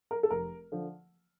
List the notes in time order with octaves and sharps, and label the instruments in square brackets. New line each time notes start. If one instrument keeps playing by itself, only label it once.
[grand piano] A#4
A4
F1 A#4
D3 F3